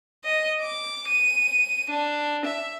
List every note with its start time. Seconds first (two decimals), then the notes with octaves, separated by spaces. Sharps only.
0.25 D#5
0.61 D6
1.08 D#7
1.90 D4
2.46 E5